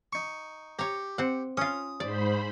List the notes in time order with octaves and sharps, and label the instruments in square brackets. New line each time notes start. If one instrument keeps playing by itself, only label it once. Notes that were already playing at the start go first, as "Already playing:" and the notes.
[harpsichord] D#4 C#6
[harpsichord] G4 [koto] C#5 A#5
[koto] C4 F#5
[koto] C#4 F4 [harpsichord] D#6
[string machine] G#2 C5 B5 [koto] D5